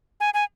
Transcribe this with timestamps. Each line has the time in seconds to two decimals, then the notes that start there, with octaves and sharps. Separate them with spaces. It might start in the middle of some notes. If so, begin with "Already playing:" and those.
0.20 G#5
0.34 G#5